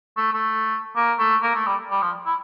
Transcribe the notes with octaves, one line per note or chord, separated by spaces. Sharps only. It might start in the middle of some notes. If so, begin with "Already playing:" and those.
A3
A3
A#3
A3
A#3
A3
G3
G3
F3
E4